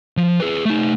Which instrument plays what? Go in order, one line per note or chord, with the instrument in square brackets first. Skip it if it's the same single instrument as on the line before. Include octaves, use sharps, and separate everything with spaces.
[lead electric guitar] F3
G#4 B4
A3 D#4